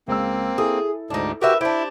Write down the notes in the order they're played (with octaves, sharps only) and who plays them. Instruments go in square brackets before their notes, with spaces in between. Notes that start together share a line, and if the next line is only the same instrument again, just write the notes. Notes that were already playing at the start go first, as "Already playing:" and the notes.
[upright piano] C#2 E6 [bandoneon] A#3 C4
[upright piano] E4 A4 [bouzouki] G#4
[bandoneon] D2 G#2 [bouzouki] D4 D#4
[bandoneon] F#4 G4 [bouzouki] A#4 B4 E5
[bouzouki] D4 G4 [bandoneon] E4 [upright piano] C5